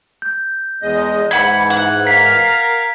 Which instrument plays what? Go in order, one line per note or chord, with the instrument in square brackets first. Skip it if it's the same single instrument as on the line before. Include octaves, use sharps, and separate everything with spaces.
[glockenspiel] G6
[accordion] E2 G#3 D#5
[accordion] G#2 E3 [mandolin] F#5 B5 [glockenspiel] G#6
[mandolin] F#5
[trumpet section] A#4 F5 [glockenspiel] B6